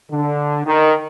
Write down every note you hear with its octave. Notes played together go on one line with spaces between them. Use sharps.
D3
D#3